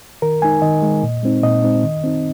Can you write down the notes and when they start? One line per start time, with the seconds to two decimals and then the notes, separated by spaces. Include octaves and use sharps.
0.22 D#3 A#4
0.42 G#3 D#4 G#5
0.62 D#3 D#5
0.82 G#3 D#4
1.03 A#2
1.23 G#3 C4 D#4
1.43 A#2 D#5
1.64 G#3 C4 D#4
1.84 D#3
2.04 C4 D#4